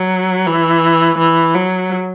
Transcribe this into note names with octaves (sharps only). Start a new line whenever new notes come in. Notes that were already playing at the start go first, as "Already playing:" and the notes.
Already playing: F#3
E3
E3
F#3